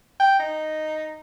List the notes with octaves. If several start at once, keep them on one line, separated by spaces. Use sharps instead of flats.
G5
D#4